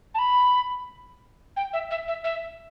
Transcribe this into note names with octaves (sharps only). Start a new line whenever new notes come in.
A5
B5
G5
E5
E5
E5
E5